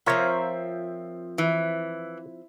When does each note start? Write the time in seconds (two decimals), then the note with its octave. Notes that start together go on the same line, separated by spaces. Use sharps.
0.06 F3 C4 F4 A#4 C#5 E5
1.38 E3